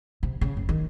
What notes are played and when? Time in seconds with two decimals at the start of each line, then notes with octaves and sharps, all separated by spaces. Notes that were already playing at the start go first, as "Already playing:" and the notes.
0.23 C3
0.41 C#3
0.57 F#1
0.69 D#3